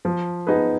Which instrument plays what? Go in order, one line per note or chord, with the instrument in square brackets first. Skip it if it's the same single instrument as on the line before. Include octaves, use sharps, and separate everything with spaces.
[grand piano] F3
B3 D#4 G#4 B4